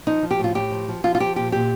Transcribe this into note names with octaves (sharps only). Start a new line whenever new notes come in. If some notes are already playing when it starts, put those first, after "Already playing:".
F3 D#4
F3
G4
A2 F4
A2 G4
F3
F3
F3 F4
F4
F3 G4
A#2 G4
A#2 G4